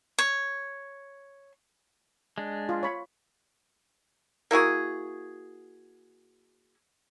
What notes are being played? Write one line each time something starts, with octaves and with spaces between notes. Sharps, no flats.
C#5
G#3 D4
F4
C#5 B5
A#3 E4 F#4 G#4